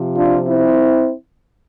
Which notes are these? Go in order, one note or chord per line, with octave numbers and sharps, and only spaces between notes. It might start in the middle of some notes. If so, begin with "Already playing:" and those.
Already playing: C3 F3
D4 F4
C4 E4